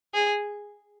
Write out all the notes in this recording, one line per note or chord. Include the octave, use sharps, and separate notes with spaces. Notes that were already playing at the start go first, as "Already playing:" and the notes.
G#4